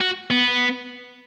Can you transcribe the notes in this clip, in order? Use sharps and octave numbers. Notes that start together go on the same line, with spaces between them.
F#4
B3